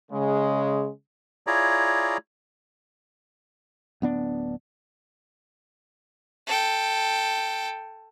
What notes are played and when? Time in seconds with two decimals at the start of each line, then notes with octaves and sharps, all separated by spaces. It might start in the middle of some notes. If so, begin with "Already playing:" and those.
0.12 C#3 G#3
1.47 E4 F4 G#4 C#5 D5 A#5
4.02 D1 B3 D4
6.47 A4 G5